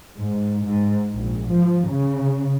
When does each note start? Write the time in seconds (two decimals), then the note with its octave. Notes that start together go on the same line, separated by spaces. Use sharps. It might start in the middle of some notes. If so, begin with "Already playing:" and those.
0.16 G#2
0.66 G#2
1.14 A#1
1.49 F3
1.91 C#3